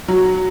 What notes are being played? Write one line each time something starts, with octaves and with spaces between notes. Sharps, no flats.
F#3